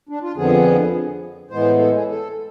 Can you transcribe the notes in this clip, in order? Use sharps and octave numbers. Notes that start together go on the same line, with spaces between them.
D4
F4
F2 D3 F3 B3 G#4
A2 E3 G#3 B3 C5
A4
G#4
A4